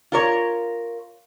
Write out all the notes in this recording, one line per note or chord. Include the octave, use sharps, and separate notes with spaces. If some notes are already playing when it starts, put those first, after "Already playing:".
F4 A#4 C#5